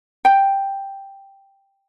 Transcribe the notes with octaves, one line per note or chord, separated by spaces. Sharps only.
G5